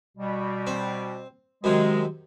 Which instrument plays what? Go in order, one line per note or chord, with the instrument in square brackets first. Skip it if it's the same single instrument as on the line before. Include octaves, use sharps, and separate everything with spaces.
[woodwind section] B2 G3
[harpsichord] C4
[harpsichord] F#2 C3 D#3 [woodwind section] G#3